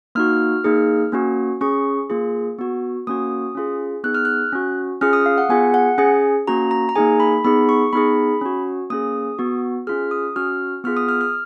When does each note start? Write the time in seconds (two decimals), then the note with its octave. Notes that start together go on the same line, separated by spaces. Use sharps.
0.15 A#3 D#4 F#4 F6
0.64 A#3 D#4 G#4
1.12 A#3 C#4 F#4
1.61 C#4 G#4 C#6
2.10 A#3 F4 G#4
2.59 B3 F#4
3.07 A#3 C#4 F#4 D#6
3.55 C#4 F4 G#4
4.04 B3 D#4 G#4 F#6
4.15 F6
4.25 F#6
4.53 C#4 F#4
5.01 C#4 F4 G#4 F6
5.13 D#6
5.26 F5
5.38 F#5
5.49 B3 F4 G#4 G#5
5.74 F#5
5.98 C#4 G#4 G#5
6.47 A#3 C#4 F#4 A#5
6.71 A#5
6.89 A#5
6.95 A#3 D#4 G#4 G#5
7.20 B5
7.45 B3 D#4 G#4 B5
7.69 C#6
7.93 B3 D#4 G#4 B5
8.41 C#4 F#4
8.90 A#3 C#4 G#4 D#6
9.39 B3 F#4
9.87 C#4 F4 G#4 F6
10.11 D#6
10.36 C#4 F#4 F6
10.84 B3 F4 G#4 F6
10.97 D#6
11.09 F6
11.21 F6